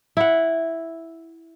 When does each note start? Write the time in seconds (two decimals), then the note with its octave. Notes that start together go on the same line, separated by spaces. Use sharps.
0.17 E4 F#5